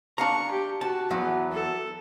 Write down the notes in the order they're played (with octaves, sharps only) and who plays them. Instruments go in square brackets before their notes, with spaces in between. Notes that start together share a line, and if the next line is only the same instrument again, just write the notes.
[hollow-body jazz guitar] D4 F5 A#5 [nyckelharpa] C#6
[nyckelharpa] G4
[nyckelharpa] F#4 [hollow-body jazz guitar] A5
[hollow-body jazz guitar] E2 F#3 [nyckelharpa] B3
[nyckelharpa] A4